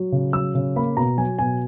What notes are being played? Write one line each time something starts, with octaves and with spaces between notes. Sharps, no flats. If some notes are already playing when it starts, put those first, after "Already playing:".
Already playing: F#3
C#3
F#3 E6
C#3
A#3 B5
B2 A#5
F#3 G#5
B2 G#5